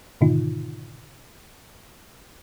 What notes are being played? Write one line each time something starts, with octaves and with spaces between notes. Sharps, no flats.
G#2 B2 D3 D#3 D#4 F4